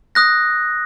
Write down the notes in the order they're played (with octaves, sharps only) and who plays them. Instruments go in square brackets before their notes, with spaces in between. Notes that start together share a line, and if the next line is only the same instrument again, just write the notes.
[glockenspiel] D#6 F#6 A#6